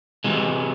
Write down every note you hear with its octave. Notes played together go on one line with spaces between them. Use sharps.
C3 E3 G#3